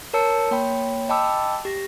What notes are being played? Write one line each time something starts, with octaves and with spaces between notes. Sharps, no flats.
A#4 C#5 A5 E6 C#7
A#3 C#5 G5 B5
D#5 G5 A5 B5 D6 E6
G4 A#6